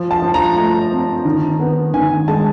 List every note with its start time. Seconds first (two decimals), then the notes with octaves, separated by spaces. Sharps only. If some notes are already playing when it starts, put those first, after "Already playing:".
Already playing: F3
0.11 A5
0.22 F3
0.34 A#5
0.56 A3 A#5
0.91 C4
1.25 D#3
1.59 B3
1.94 D#3 G#5
2.28 G#3 A5